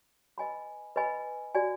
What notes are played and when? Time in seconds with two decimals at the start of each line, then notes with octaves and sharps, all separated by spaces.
0.38 B4 D#5 G#5 B5
0.96 B4 D#5 G#5 B5
1.55 F#4 D5 G#5